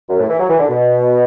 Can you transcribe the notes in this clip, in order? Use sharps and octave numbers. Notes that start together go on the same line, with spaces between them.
F#2
A2
E3
F#3
E3
D3
B2